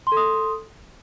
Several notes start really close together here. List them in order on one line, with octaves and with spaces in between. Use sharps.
C6 A4 D#6